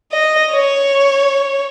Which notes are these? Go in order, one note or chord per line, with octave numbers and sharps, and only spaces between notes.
D#5
C#5